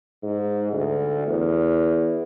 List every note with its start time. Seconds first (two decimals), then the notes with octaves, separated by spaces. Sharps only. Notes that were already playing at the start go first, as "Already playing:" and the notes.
0.23 G#2
0.73 D2
1.28 E2